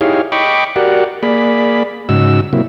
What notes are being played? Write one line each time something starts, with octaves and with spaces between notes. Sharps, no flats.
D#4 E4 G4 G#4 C#5 F5
D#5 G5 B5 C#6 D6
F#4 G4 A#4 D5 F#5
A#3 G#4 D5 B5
G#2 C#3 D#4 F#4 E6
C3 F#3 A#3 E4